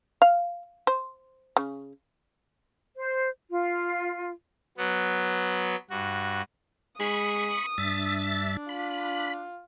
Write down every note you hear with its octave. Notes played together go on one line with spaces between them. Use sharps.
F5
C5
C#3
C5
F4
F#3 B3
G2 F#4
G#3 B5 C#6 D#6
G2 D4 E5 A6
F4 B5